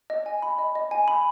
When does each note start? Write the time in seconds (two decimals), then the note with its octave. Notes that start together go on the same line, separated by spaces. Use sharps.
0.10 D#5
0.26 G#5
0.42 B5
0.58 D#5
0.75 D#5
0.91 G#5
1.08 B5